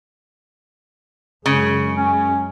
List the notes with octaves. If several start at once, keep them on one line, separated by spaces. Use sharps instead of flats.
F#2 C#3 G#3 G#4
C#4